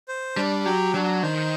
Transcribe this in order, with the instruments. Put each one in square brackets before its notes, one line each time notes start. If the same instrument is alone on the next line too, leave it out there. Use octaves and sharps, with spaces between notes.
[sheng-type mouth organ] C5
[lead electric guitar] G3 [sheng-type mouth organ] D4
[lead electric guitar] F#3 [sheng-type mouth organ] G4
[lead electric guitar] F#3 [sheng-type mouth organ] D4
[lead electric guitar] D#3 [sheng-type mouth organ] C5